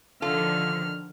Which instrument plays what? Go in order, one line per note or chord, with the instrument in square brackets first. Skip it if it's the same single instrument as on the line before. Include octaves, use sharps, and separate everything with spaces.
[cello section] D3 D#3 F3 [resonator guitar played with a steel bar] F4 A4 [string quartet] F6